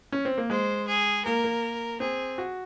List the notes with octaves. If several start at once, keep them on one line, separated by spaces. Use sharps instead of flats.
C#4
C4
A#3
G#3 C5
G#4
A#3 A#4
A#3
C4 G#4
F#4